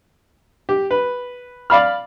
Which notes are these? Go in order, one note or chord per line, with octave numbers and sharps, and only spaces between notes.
G4
B4
D5 F5 B5 F6